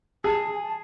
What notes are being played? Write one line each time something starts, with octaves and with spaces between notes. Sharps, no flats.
G#4 A5
G#5
A5